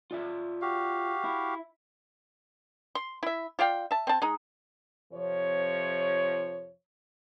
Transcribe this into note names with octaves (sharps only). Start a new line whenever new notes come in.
F4 D5 E5
F#4 G4 F5
E4
C6
E4 E5
F4 D5 F5 G5
E5 A5
C4 A5
G#3 D#4
F2 C3 F3 C#5